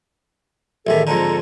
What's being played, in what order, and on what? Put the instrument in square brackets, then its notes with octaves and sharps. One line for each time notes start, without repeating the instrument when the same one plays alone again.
[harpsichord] A1 E2 D#3 [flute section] G4 A4 E5
[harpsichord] F2 G#2 D3 [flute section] A4 A5 A#5